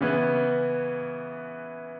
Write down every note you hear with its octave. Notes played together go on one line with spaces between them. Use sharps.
C#3 E3 B3